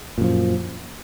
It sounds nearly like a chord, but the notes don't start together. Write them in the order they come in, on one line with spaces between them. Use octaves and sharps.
A#2 F#2 F3